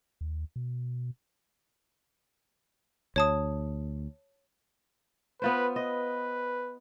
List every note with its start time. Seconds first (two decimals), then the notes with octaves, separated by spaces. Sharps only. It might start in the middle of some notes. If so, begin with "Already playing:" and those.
0.21 D#2
0.56 B2
3.16 D2 C#5 A5 D#6
5.42 B3 F4 B4 C5
5.76 B4 D#5